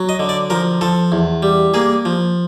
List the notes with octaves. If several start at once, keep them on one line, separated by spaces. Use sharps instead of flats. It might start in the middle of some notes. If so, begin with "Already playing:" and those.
Already playing: F#3
D#5
D3
D5
F3 A#4
F3 A4
E2
G3
A#3 G#4
F3